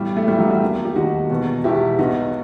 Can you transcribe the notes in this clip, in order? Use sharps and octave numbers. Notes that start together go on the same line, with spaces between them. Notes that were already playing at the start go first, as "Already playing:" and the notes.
Already playing: B1 A2 E3 G3
A3
B1 A2 E3 G3
F#3
G3
E1 D#2 D#3
G4
E1 D#2 D#3 D#4 F#4
E1 E2 B2
E1 E2 B2 E4 G4
B1 B2 D#4 F#4